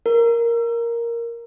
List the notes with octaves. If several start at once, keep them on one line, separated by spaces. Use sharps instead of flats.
A#4